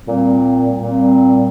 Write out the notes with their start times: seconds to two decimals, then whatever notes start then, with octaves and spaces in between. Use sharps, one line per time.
0.06 A#2 G3 C4
0.83 A#2 G3 C4